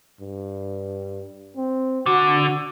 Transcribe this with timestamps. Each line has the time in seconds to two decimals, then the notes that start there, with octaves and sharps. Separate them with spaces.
0.20 G2
1.57 C4
2.06 D3 F#4